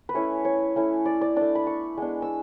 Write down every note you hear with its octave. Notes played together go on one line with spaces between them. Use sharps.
B4
A3 C#4 E4 C#5
C#5
A3 C#4 E4
D5
D5
A3 D4 D5
B5
C#6
G#3 B3 D4
E6